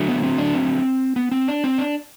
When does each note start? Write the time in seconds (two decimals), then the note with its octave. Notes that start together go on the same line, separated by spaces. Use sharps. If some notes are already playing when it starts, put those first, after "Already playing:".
Already playing: D3 F#3 A3
0.08 B3
0.23 C4
0.38 D4
0.54 C4
1.16 B3
1.32 C4
1.48 D4
1.64 C4
1.78 D4